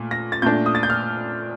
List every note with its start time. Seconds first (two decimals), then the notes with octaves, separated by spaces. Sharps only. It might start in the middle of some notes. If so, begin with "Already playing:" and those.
Already playing: A#2 A3
0.11 A#6
0.32 A6
0.42 A#2 A3 D4 G6
0.66 D#6
0.75 A6
0.83 G6
0.90 F6